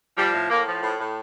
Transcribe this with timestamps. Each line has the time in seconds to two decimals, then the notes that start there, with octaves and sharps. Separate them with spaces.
0.17 F3 G3
0.33 A2
0.50 A2 A#3
0.66 F3
0.82 A2
0.99 A2